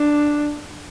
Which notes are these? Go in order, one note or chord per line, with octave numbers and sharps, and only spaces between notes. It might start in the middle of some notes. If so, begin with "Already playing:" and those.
Already playing: D4